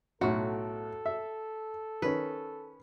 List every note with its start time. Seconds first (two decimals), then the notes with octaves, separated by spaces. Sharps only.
0.21 B1 A2 F#4 A4
1.06 E5
2.02 D#3 C#4 B4